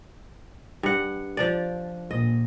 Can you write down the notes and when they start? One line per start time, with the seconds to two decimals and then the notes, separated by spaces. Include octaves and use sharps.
0.83 G2 F#5
1.37 F3 D4 D5
2.11 A#1 D#5